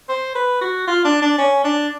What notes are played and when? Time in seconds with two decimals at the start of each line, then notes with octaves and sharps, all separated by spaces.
0.09 C5
0.35 B4
0.61 F#4
0.87 F4
1.05 D4
1.22 D4
1.38 C#4
1.64 D4